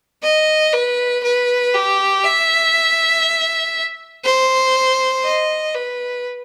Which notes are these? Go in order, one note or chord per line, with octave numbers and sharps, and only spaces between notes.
D#5
B4
B4
G4
E5
C5
D#5
B4